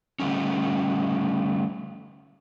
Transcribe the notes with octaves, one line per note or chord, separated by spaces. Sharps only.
D3 G3 A3 C#4